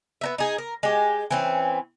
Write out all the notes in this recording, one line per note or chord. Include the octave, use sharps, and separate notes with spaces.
B3 D#4 E5
D#4 G#4
A#4
G#3 G4
E3 C4 C#4